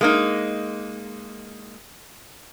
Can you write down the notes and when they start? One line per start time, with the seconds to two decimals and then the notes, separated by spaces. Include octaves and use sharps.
0.01 G#3 A#3 D#4